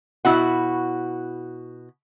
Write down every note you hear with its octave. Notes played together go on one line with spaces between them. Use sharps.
B2 E4 F#4 F#5